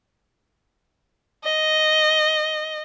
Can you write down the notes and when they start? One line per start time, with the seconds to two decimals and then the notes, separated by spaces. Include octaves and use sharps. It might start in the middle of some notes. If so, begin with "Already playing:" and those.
1.44 D#5